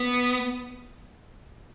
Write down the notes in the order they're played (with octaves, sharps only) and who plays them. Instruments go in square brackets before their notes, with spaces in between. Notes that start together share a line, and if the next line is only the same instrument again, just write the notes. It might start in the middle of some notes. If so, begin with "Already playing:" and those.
Already playing: [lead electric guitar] B3